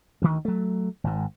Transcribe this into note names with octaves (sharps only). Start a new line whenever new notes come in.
D2 D#3
F#3 A3
G#1 G#2